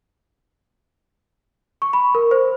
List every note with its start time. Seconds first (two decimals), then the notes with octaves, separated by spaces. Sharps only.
1.82 C#6
1.93 B5
2.15 A#4
2.31 C5